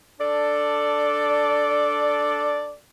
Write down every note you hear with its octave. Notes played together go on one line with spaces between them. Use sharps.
D4 A4 D5